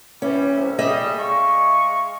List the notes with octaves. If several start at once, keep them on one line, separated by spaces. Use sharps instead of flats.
E3 G3 C#4
C2 E5
G3 G#4 D#5 E5
G#3 F5 C#6